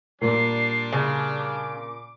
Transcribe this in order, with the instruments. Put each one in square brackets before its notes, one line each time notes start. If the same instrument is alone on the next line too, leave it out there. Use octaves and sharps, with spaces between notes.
[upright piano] A#2 [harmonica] G3 D4 [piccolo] C7
[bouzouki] C#3 [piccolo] D6